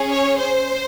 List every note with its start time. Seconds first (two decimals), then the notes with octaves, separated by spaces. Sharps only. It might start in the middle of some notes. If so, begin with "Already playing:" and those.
Already playing: C#4 G#4
0.11 C#5
0.39 C5